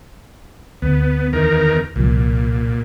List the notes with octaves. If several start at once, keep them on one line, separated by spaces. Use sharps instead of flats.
D2 B3
E2 D#3 A#4
C2 A#2 F3